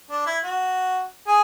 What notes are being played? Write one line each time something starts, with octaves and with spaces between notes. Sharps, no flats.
D4
E4
F#4
G#4